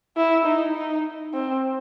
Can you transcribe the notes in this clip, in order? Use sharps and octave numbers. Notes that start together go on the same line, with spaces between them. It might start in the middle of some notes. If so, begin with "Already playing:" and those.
E4
D#4
D#4
C4